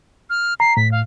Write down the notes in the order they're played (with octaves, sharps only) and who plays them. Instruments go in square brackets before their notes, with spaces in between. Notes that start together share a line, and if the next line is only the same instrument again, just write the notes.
[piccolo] F6
[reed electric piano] A#5 [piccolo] C7
[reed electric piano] A2 [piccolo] B6
[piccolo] F5